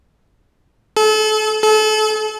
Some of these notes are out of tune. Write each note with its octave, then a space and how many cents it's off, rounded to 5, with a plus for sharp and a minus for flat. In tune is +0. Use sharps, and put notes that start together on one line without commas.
A4 -35
A4 -35